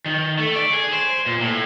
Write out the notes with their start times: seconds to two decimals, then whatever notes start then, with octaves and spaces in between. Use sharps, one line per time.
0.06 D#3
0.39 A3
0.55 D5
0.73 G#4
0.92 C5
1.26 A#2
1.41 A2